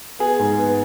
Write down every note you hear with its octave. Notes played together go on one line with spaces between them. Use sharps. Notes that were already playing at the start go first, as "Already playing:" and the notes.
B3 G#4
G#2
B3